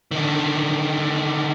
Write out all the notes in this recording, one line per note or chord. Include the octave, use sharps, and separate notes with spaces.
D3 D#3